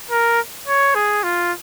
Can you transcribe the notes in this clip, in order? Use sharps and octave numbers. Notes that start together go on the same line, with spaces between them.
A#4
C#5
G#4
F4